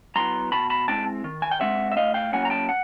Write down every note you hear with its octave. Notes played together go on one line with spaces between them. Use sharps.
F#3 B3 E4 A#5 C6
B2 A5 B5
A5 B5
G#3 C4 E4 G5 A5
D#3
G#5
G5
G#3 C4 E5 F#5
E5
A2 D#5 F5
F5 G5
F#3 A#3 C#4 E4 F#5 G#5
A#5
G5 A5
F#5